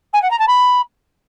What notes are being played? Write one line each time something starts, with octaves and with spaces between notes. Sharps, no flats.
G#5
F#5
A#5
A5
B5